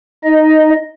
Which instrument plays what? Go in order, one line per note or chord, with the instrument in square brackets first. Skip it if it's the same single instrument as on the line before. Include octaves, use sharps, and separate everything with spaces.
[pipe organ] D#4 D#5